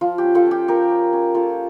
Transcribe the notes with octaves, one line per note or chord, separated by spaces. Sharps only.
F3 F4
C#4 G4
F4 A4
C#4 G4
F3 G4 A#4
C#4
C#4
A#3 F4 A4